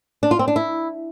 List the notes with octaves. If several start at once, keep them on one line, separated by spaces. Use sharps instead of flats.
D4
F4
C4
D4
E4